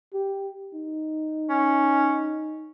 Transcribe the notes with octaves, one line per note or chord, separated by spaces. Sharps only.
G4
D#4
C#4